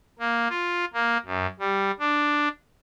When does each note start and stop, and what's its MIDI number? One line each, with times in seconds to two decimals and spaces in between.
0.19 0.48 58
0.50 0.85 65
0.93 1.17 58
1.25 1.46 42
1.60 1.91 55
1.99 2.48 62